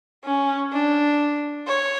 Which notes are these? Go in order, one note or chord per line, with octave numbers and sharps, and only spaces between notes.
C#4
D4
C#5